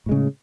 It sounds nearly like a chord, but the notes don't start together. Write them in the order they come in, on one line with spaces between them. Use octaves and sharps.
A2 G#3 C#3